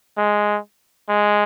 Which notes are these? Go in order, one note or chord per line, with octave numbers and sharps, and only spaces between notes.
G#3
G#3